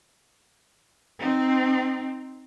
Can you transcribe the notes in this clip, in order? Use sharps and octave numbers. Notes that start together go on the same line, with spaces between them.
C4 D#4